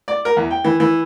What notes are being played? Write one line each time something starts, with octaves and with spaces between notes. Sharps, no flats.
D5
A#4
E2
G5
E3
E3